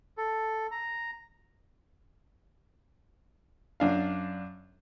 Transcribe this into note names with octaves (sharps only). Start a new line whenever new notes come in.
A4
A#5
F#2 D4 F5